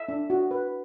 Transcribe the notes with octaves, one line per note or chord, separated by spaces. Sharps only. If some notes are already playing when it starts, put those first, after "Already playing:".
Already playing: E5
D4
F#4
B4